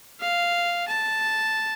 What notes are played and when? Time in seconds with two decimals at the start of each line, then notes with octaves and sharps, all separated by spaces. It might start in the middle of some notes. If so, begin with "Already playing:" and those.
0.21 F5
0.88 A5